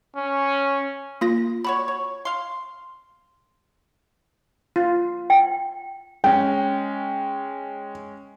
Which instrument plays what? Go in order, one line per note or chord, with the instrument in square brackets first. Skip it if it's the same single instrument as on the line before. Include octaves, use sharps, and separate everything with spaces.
[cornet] C#4
[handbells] A#3 F4 A#6
[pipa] D3 F#4 C#5 [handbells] B5
[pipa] C#5
F5 C6
[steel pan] F4
[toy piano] G5
[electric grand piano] G#3 C#4 [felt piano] G5